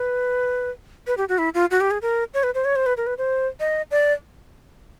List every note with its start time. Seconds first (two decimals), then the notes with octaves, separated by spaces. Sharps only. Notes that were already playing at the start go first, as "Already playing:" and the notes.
Already playing: B4
1.07 B4
1.17 G4
1.29 F#4
1.38 E4
1.54 F4
1.71 F#4
1.80 G4
1.91 G#4
2.02 A#4
2.34 C#5
2.43 B4
2.55 C5
2.65 C#5
2.76 C5
2.86 B4
2.97 A#4
3.07 B4
3.18 C5
3.60 D#5
3.91 D5